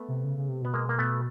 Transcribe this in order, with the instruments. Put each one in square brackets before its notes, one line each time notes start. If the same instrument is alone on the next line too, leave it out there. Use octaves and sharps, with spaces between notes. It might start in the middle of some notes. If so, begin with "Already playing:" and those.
Already playing: [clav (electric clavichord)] A3 B3
[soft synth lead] C3
C#3
C#3
C3
[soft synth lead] B2 [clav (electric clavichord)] B3
[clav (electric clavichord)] G#3 A#3
A#3
A3 B3